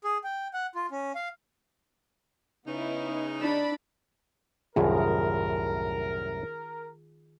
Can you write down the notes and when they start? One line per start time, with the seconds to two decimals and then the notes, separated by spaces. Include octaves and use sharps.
0.04 G#4
0.24 G5
0.53 F#5
0.75 F4
0.91 C#4
1.15 F5
2.67 C#3 B3 D#4 E4
3.41 D4 D5 B5 E6
4.76 C2 F#2 A2 D#3 F4 G#4 A#4